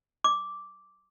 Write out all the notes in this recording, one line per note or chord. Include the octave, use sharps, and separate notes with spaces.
D6